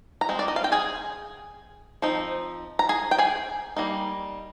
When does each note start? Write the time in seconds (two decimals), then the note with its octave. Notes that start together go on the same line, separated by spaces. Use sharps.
0.21 A#5
0.29 G#3 C4
0.39 D5
0.48 D#5
0.56 F5
0.64 G5
0.72 G#4 G#5
2.02 F3 C4 D#4
2.79 A#5
2.89 G#4 G#5
3.11 G5
3.18 G#4 G#5
3.76 G3 A#3 D#4